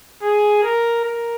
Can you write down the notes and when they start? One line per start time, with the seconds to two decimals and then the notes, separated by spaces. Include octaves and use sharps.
0.22 G#4
0.63 A#4
1.05 A#4